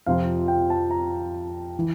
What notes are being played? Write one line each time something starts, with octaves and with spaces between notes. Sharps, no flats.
F2 C3 F3 C4 F5
G5
A5
A#5
E3